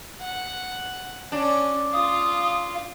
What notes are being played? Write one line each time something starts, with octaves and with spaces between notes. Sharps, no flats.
F#5
C#4 D4
F4 F5 D#6